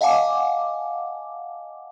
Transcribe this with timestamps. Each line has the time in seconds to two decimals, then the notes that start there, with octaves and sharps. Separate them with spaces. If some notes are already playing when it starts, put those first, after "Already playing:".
0.01 D#5 F5 F#5 G#5 A5 D6